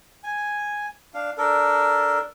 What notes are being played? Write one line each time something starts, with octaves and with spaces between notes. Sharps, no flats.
G#5
D4 F5
D4 A4 A#4